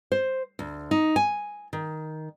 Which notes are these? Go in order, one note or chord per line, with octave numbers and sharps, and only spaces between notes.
C5
D2
D#4
G#5
D#3